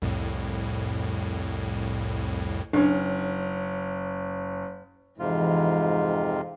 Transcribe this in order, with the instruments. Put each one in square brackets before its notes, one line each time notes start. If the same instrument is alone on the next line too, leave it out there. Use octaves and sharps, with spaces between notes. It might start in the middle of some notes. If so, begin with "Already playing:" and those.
[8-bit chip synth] C2 F2 A2
[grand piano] F#1 C#4 [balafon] D4
[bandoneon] F2 C3 F4 [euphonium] G#2 [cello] E3